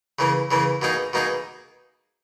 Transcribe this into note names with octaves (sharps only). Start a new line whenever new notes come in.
C#3 E3 A#3
C#3 E3 A#3
B2 A#3 D#4 G#4
B2 A#3 D#4 G#4